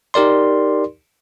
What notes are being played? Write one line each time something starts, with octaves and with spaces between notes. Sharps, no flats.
D#4 G4 A#4 D5 C6